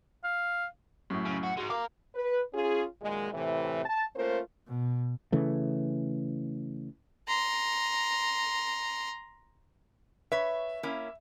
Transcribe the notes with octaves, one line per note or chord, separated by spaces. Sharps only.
F5
F#2 A2
C#3
F#4
G#2 G#3 F#4
A#4 F5 D6
B4
C#4 F4 G#4
F#2 A#2 D#3 G#3
A2 C3 E3
A5
A3 A#3 C#4 F4 A#4 C5
B2
C#3 E3 A3
A#5 C6
B4 C#5 E5
A#3 C#4 E4